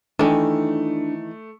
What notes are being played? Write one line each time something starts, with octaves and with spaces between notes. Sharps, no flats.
D#3 E3 A3 D4